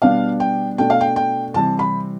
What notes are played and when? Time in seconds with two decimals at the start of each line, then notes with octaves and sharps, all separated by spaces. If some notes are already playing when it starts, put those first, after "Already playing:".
0.02 B2 G3 B3 D4 F5
0.40 G5
0.78 B2 A3 D4 G5
0.90 F5
1.01 G5
1.16 G5
1.54 C3 E3 G3 C4 E4 A5
1.79 B5